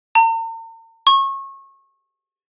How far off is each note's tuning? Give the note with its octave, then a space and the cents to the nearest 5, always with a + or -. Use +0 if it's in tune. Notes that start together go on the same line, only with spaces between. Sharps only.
A#5 -45
C#6 -30